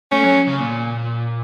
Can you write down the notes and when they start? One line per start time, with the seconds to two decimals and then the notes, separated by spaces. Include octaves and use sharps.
0.12 A3 C#4
0.24 F#3
0.48 C#3
0.59 A#2